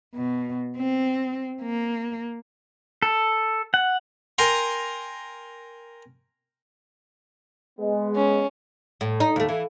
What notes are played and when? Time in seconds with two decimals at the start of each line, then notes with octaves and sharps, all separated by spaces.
0.15 B2
0.78 C4
1.62 A#3
3.02 A4
3.74 F#5
4.38 A#4 G5 G#5 A#5 C6
7.79 G#3 B3
8.15 C#4
9.01 A2
9.20 D#4
9.36 D#2 A3
9.49 E3